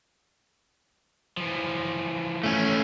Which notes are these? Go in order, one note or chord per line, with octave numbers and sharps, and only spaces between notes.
E3 F3
A3 C#4